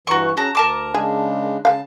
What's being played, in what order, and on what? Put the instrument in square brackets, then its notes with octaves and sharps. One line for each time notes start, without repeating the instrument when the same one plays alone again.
[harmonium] G2 E3 [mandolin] F#4 A#5 C#6
[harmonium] C#4 G#4 [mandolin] F#4 A5 A#5
[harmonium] D2 A#5 [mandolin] A#4 A5 D6
[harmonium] C#3 G#3 D4 [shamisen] G#4
[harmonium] C#3 A5 [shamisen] G#3 F5